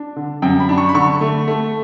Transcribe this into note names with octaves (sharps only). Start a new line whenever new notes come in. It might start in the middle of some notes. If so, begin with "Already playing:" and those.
Already playing: D4
D3
F#2 G5
B5
D4
C#6
B5
D3 C#6
A3
A3